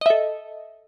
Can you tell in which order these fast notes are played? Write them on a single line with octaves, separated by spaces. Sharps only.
D#5 E5 A4